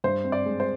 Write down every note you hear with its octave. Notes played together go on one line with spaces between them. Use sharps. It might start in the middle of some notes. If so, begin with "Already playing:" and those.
G2 C5
C4
D5
G#3
C5